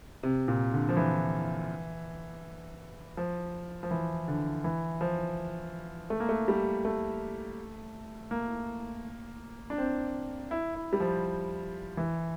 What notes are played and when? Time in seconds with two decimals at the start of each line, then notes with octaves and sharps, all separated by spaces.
0.23 C3
0.48 A#2
0.73 D3
0.89 F3
0.97 E3
3.17 F3
3.83 F3
3.91 E3
4.28 D3
4.64 E3
5.01 F3
6.10 A3
6.20 A#3
6.29 A3
6.48 G3
6.85 A3
8.31 A#3
9.70 D4
9.78 C4
10.51 E4
10.75 E4
10.93 G3
11.00 F3
11.97 E3